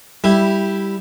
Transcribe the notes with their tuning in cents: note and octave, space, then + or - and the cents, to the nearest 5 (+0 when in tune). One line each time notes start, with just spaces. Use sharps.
G3 +0 E4 +0